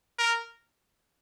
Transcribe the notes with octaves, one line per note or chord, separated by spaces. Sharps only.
A#4